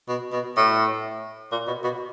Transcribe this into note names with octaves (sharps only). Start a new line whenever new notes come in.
B2
B2
A2
A#2
B2
B2